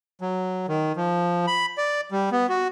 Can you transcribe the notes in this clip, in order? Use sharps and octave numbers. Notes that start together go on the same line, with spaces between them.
F#3
D#3
F3
B5
D5
G3
B3
F#4